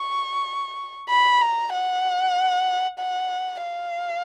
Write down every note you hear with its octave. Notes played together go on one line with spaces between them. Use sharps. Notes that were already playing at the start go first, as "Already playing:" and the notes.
Already playing: C#6
B5
A#5
F#5
F#5
F5